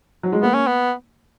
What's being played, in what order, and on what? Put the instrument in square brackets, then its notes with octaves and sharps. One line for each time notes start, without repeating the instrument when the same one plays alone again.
[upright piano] F#3
G#3
[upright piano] A#3 [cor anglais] B3
[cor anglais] C#4
B3